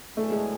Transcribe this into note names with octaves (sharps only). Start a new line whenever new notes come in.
A2 F#3 A3 B3 D4 G#4
G#3